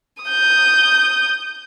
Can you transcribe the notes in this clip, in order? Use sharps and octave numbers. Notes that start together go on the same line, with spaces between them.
D#6 G6